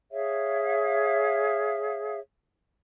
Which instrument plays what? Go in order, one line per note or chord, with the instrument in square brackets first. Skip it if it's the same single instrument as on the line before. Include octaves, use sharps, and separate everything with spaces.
[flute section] G#4 C#5 E5 F5